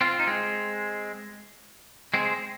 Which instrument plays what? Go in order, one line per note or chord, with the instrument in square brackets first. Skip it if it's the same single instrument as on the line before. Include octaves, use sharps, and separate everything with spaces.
[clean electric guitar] C4 F4
D#4
G#3 C4
G#3 C4